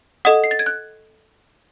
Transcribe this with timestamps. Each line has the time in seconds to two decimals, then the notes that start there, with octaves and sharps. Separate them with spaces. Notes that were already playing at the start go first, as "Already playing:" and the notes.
0.25 A4 D#5 F#5 D#6
0.44 C7
0.51 A6
0.59 G#6
0.66 F#6